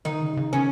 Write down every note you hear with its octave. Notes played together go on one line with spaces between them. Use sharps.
D#3 D#4
C#3
C#3
D#3 C#4